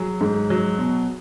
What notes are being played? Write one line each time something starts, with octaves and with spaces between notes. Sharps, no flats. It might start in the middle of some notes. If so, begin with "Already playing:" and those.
Already playing: F#3 G#4
G#2
F#3
B2